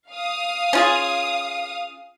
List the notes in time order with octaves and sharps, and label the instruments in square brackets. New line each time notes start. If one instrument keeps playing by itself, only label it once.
[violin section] F5 D#6
[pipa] C#4 F4 G#4